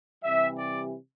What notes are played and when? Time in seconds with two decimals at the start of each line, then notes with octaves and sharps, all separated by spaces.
0.23 C3 E3 G3 E5
0.58 D5